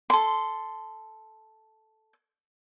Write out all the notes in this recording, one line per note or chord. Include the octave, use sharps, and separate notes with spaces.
A4 C6